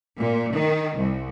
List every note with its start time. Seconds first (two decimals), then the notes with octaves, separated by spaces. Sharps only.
0.18 A#2
0.54 D#3
0.96 C2